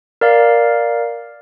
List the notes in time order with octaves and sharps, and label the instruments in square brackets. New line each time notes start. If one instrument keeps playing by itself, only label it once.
[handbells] A#4 D5 F5